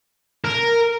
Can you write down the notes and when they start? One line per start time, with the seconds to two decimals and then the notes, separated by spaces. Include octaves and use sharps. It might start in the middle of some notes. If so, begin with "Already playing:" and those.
0.45 A#4